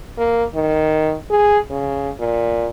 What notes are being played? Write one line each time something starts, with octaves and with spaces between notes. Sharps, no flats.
A#3
D#3
G#4
C#3
A#2